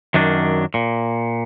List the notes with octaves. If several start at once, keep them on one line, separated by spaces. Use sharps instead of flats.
F#2 D#3 F#3 D4
A#2